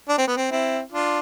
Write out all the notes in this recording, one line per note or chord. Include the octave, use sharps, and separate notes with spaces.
D4
C4
B3
C4
C4 E4
D4 F4